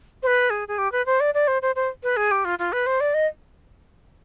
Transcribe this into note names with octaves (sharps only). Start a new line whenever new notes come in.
C5
B4
G#4
G#4
G4
B4
C5
D5
D5
C5
C5
C5
B4
G#4
G4
F4
F4
B4
C5
D5
D#5